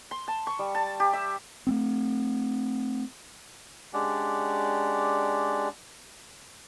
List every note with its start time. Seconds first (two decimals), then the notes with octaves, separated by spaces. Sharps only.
0.11 C6
0.28 A5
0.47 C#6
0.59 G3
0.75 A5
1.00 G4
1.13 E5
1.67 A3 B3 C4
3.93 G#3 C#4 D4 G4 D5 F#5